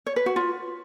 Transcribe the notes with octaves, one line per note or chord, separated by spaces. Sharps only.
C#5
B4
F#4
F4